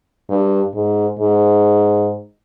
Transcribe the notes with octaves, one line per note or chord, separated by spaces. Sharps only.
G2
G#2
G#2